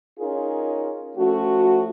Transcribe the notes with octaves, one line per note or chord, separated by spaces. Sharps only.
C#4 D#4 F4 G#4 A#4
F3 A3 C#4 F#4